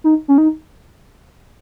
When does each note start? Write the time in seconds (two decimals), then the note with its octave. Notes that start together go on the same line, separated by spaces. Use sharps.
0.04 D#4
0.28 C#4
0.38 D#4